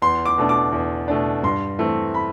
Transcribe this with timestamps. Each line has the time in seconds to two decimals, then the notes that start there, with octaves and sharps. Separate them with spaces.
0.02 E2 C6
0.26 D6
0.38 B2 A3 D4
0.49 D6
0.72 E2
1.08 B2 A3 D4
1.43 G2 C6
1.79 E3 A3 C4
2.14 B5